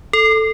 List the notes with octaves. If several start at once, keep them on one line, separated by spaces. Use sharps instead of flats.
A4